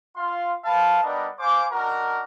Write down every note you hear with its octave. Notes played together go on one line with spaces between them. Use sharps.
F4 F5 C6
B4 F5 A5
G3 B3 D4 A#4 D5 D#5
C5 F5 G#5 D6
D4 D#4 F#4 A#4